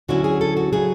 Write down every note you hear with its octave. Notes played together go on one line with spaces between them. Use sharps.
D2 D3 F#3 C#4 E4 F#4
G#4
A4
F#4
C#3 F#3 G#4